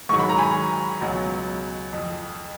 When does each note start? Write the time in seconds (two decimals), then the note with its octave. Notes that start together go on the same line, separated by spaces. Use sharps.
0.09 G#2 D#3 F#3 C#6
0.19 B5
0.29 A#5
0.38 G#5 B5
1.01 C#2 B2 F#3
1.93 F2 F3